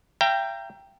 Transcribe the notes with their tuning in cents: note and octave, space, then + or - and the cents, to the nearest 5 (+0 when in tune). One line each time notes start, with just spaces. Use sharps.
E5 +45 G5 +0 A#5 -5